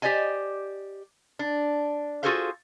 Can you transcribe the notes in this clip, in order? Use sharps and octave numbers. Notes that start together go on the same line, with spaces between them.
G4 C5 D5 D#5 G#5
D4
F4 F#4 G#4 A4 C5 F5